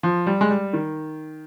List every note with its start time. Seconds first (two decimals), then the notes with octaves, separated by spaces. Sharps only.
0.03 F3
0.27 G3
0.41 G#3
0.50 G3
0.73 D#3